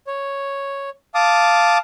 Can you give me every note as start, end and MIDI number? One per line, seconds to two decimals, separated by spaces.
0.07 0.90 73
1.14 1.78 77
1.14 1.78 81
1.14 1.78 86
1.14 1.78 87